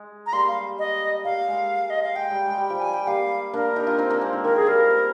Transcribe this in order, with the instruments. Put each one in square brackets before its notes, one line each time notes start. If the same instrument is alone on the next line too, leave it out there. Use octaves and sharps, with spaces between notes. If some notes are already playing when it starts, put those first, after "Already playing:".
Already playing: [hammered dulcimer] G#3
[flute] A#5
[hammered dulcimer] G3 A#3 [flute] C6
[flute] F5
D#5
[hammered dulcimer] G3 A#3 [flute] F5
[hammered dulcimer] G#3
[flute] D#5
F5
[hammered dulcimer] G#3 [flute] G5
[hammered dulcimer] G3
G#3
G3
F3
[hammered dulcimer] G3 [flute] G#5
[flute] G5
[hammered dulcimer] G3 A#3 [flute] F5
[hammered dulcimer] A#3 D4 [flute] A#4
[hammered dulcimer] D#4 G4
D4 F4
C4 D#4
A#3 D4
G#3 C4
D#3
[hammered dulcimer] D#3 [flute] A#4
[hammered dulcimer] F3 [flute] G#4
[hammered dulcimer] G3 [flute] A#4
[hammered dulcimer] G3 A#3